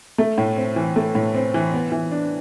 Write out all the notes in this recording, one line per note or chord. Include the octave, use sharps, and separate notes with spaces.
A3
A2
C4
E3
A3
A2
C4
E3
B3
E3
D4